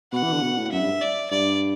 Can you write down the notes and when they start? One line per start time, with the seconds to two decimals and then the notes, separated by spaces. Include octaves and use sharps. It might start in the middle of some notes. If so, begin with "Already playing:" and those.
0.12 B2 F#5
0.23 E3
0.33 D3
0.42 B2
0.58 A2
0.72 F#2 E5
0.81 G2
1.02 D5
1.31 G2 D5